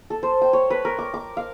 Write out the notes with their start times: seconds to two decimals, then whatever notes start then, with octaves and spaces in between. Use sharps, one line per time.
0.10 A4
0.23 C5
0.41 G5
0.53 C#5
0.70 B4
0.85 A#4
0.99 D6
1.14 D6
1.37 F5